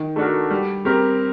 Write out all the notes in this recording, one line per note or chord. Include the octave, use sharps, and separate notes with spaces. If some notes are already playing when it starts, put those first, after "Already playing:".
Already playing: D#3
A3 D4 F#4 A#4
G3
C4 G4 A#4